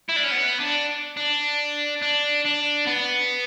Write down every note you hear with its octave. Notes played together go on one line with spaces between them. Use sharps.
E4
D4
C#4
B3
D4
D4
D4
D4
B3